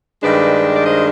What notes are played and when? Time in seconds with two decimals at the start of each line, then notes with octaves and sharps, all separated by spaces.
0.22 G2 D#3 G#3 D4 B4 D5
0.74 D5
0.84 C5 D#5